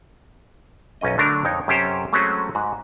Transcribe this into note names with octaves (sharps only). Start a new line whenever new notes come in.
B1 F#2 C#4 D#5
D3 F#3 A3 D4 A#4
F2 D#4 C#5
F#2 C3 C#4 G4 A4 C5
F#3 G#3 A3 C4 C#4 F#4
G#2 F#4